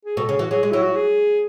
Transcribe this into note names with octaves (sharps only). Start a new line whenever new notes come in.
G#4
B2 A4
C#3 G#4
E3 F#4
F#3 G#4
G#3
F#3 E4
F#4
G#4